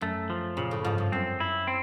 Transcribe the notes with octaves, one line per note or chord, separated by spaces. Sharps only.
F#2 A3
F3
A#2 C#3
A2
G#2 F3
G2
F#2 C4
E4
C4